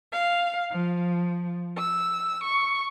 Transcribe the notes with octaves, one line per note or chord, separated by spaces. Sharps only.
F5
F3
E6
C#6